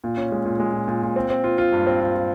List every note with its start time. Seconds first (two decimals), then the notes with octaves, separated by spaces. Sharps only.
0.04 A#2
0.17 C#4
0.32 G#3
0.45 A#2
0.60 G#3
0.73 A#2
0.88 A#2
1.03 A#2
1.16 C4
1.30 C4
1.44 F4
1.58 F4
1.73 G2
1.87 C4
2.00 F4
2.15 F4